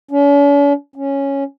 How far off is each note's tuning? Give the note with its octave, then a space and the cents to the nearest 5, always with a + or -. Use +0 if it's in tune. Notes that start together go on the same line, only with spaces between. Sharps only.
C#4 +45
C#4 -5